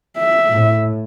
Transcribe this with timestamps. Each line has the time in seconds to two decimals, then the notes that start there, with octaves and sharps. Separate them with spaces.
0.18 E5
0.50 A2